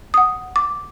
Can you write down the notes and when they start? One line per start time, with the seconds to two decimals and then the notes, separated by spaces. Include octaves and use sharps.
0.14 F#5 D#6
0.56 D6